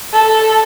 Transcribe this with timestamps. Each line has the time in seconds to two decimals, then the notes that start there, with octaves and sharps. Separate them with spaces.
0.13 A4